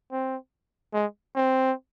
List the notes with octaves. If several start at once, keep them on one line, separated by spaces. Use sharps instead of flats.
C4
G#3
C4